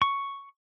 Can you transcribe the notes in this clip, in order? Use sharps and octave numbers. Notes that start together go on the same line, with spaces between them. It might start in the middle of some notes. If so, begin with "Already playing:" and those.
C#6